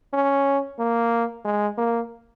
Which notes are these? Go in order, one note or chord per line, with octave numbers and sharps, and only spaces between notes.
C#4
A#3
G#3
A#3